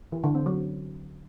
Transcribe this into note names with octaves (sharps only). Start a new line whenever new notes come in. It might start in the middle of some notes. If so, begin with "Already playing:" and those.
E3
D3
C4
F#3